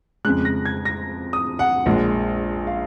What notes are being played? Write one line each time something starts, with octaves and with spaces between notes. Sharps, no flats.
F2 C#3 G#3 F#6
A#6
G#6
A#6
D#6
F#5
A#1 A#2 G#3
F5